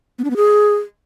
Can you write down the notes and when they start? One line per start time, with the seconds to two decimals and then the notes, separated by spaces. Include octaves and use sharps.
0.19 B3
0.24 D4
0.30 B3
0.36 G#4